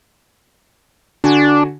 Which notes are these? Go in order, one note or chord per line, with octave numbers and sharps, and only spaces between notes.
D3 D4 F#4 G#5